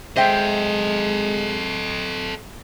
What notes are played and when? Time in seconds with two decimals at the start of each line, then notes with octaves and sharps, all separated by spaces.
0.16 G#3 A4 C5 D#5 E5 G5